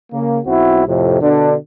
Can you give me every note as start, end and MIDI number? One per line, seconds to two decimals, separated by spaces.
0.13 0.41 49
0.13 0.41 58
0.46 0.86 35
0.46 0.86 60
0.46 0.86 64
0.46 0.86 66
0.88 1.19 41
0.88 1.19 45
0.88 1.19 48
1.22 1.55 47
1.22 1.55 50
1.22 1.55 62